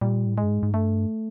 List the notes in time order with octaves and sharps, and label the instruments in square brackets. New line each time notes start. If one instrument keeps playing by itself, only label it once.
[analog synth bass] A#2 [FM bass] G3
[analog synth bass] A2
[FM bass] G#3
[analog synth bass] G2
G#2
G#2
[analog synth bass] G2 [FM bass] A3